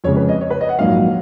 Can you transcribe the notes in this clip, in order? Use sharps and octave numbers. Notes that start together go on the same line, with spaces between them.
F2 C#3 G#3 C#5
B4
D#5
C#5
B4
D#5
F#5
A#1 G#2 D#3 F#3 F5